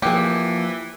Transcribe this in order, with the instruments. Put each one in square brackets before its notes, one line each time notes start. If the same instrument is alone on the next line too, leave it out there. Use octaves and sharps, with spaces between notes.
[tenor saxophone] E3 [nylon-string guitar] F3 A#3 [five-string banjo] G4 G#4